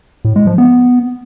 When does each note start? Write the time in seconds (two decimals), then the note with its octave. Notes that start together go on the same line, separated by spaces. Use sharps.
0.25 A2
0.36 G#3
0.47 F3
0.58 B3